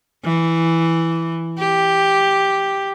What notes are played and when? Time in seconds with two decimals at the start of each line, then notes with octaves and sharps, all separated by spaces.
0.25 E3
1.59 G4